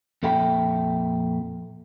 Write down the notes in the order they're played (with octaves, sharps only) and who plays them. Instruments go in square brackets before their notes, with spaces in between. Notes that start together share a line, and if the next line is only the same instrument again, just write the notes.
[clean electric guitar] F2 A#2 A4 E5 G5 B5